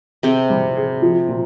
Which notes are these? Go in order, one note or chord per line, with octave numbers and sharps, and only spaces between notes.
C3 C4 G#4
G3
G#4
F3
A#2